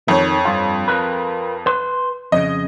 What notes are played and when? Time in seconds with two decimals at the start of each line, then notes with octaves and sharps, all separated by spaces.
0.08 F2 D#3 C#5
0.45 G2 F4
0.88 F4 A#4 B4
1.66 B4 C6
2.32 F2 C#3 D#5